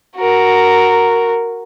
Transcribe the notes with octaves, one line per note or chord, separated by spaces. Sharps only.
F#4 A#4